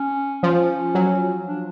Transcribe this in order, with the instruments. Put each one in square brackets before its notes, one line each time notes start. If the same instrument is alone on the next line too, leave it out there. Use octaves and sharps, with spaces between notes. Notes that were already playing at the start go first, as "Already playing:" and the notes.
Already playing: [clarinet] C#4
[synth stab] F3 [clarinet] C#4
[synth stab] F#3
[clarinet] D4